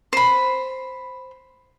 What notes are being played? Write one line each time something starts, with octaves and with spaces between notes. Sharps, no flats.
C5 B5